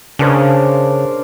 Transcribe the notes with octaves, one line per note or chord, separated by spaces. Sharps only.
C#3 D4 A#4 C5